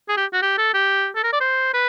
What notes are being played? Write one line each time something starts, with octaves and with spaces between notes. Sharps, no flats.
G#4
G4
F#4
G4
A4
G4
A4
A#4
D5
C5
B4